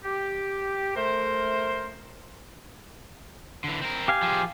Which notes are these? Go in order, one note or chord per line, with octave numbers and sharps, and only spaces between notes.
G4
A3 A#4 C5
D3 E3
C4 A#4
G4 F5 G#5
F3 G#4